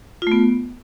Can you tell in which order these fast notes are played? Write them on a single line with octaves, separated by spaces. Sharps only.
F4 A3 B3